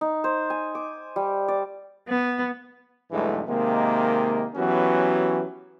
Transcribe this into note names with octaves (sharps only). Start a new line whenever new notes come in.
D#4
C5
G#5
D6
G3
D5
B3
B1 E2 G2 E3 G#3 A3
C3 D#3 G#3 A#3
E3 F#3 B3 C#4 F#4 G4